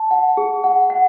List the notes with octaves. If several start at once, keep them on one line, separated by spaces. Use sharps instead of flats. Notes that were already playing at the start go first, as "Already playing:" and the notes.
Already playing: A5
F#5
G#4
F#5
F#5